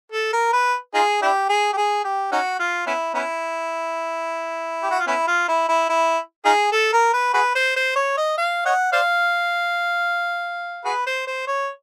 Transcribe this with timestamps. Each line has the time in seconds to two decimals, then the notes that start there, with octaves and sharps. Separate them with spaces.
0.12 A4
0.33 A#4
0.53 B4
0.94 D#4 F4 G#4
1.22 D4 E4 G4
1.49 G#4
1.73 G4
1.77 G#4
2.04 G4
2.32 C#4 D#4 F#4
2.59 F4
2.87 B3 C#4 E4
3.14 B3 C#4 E4
4.83 G4
4.91 F#4
5.00 F4
5.07 B3 C#4 E4
5.27 F4
5.48 E4
5.69 E4
5.89 E4
6.45 D#4 F4 G#4
6.72 A4
6.93 A#4
7.13 B4
7.34 F#4 G#4 B4
7.55 C5
7.76 C5
7.96 C#5
8.17 D#5
8.38 F5
8.65 C#5 D#5 F#5
8.92 C5 D5 F5
10.85 F#4 G#4 B4
11.06 C5
11.27 C5
11.47 C#5